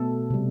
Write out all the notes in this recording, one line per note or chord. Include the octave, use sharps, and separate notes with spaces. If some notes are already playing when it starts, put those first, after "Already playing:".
Already playing: B2 A3 A4
C3 G3